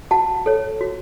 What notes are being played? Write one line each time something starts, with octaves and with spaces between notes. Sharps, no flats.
F#4 F#5 A5
A4 C#5
F#4